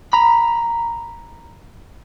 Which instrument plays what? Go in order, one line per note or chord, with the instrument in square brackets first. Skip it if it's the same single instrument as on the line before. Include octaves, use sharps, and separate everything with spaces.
[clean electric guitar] A#5 B5